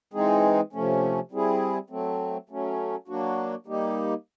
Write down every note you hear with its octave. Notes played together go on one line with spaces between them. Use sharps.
E3 G#3 C4 D#4 G#4
C3 F3 A3 C#4
G3 C4 E4 G#4
F#3 A3 C4
F#3 A3 C#4
F#3 A#3 D4 F#4
G3 A#3 D#4 G4